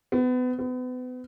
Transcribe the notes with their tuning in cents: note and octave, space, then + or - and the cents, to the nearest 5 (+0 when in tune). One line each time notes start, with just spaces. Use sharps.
B3 +30
B3 +35